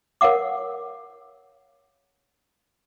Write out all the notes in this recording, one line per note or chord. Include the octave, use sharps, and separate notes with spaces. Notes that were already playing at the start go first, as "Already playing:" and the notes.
A#4 C#5 F5 F#5 D6